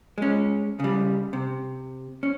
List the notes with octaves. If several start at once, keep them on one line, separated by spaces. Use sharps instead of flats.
G#3 C#4
C#3 G3
C3
C#4